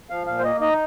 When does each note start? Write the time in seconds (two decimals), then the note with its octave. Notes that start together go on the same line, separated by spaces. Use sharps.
0.10 F3 F5
0.26 A#2 F5
0.39 C5
0.43 A#3 D#5
0.61 D#4 D#5